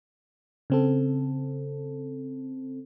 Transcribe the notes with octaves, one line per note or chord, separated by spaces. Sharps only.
C#3 C4 A4